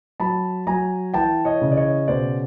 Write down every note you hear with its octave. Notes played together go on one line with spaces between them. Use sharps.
F#3 A5 B5
F#3 G#5 A#5
E3 G5 A5
C#5 D#5
C#3
D5
C#5 D#5
B2 C5 D5